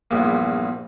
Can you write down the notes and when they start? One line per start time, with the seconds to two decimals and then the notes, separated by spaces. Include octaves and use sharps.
0.11 A#1 E2 G2 A#2